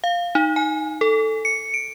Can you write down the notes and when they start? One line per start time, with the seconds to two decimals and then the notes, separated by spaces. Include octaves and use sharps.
0.04 F5
0.35 D#4
0.56 G#5
1.01 A4
1.45 C#7
1.74 D7